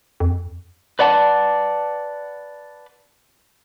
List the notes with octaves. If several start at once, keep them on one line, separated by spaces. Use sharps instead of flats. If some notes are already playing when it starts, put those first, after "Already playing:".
F2
B4 D5 F#5 A5